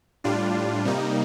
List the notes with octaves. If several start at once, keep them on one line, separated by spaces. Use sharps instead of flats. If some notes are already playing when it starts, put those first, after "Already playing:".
A2 G3 D4 F4
C3 G3 A#3 D#4